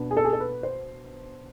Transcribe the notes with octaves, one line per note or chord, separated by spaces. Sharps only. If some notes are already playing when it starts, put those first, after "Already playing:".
Already playing: B2 B3 D4
G#4
A4
G#4
A4
B4
C5